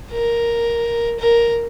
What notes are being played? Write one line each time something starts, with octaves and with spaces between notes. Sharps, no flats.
A#4
A#4